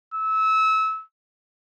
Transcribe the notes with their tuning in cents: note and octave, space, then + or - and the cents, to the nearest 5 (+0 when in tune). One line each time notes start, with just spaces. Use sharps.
E6 -25